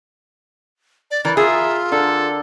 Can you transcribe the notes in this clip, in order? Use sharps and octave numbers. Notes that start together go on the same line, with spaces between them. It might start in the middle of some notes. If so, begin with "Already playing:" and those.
D5
E3 A#4 D5
F4 G#4 E5
D3 A4